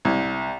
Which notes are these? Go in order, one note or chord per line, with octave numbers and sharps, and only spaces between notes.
C2